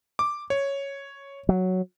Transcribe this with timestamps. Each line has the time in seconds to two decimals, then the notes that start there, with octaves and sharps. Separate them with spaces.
0.19 D6
0.50 C#5
1.49 F#3